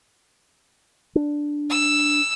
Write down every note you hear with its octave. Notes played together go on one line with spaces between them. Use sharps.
D4
E6